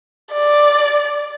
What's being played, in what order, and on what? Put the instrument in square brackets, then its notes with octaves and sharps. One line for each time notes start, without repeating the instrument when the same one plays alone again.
[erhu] D5